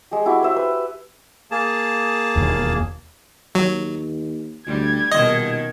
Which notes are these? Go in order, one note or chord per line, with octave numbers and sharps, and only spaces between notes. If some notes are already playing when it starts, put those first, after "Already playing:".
G#3 G4
E4 F#4 G4 D6
C5 E5 G5
B4
A#3 G#4 A5
E1 D#2
D#2 F#3
D2 G3 G#6
D#1 B2 D#3 D#5